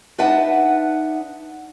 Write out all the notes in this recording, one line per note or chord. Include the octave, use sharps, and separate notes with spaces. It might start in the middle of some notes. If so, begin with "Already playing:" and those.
D4 D#4 B4 E5 F#5 A5